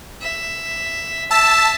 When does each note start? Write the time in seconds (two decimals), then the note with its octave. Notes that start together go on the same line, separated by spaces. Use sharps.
0.22 E5
1.31 E5 A5 E6